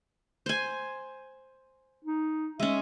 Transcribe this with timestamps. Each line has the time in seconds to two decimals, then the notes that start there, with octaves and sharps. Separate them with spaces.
0.46 C5 G#5
2.05 D#4
2.60 G#3 C#4 E5